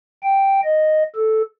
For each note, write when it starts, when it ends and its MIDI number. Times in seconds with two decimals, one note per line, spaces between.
0.23 0.60 79
0.64 1.03 75
1.16 1.42 69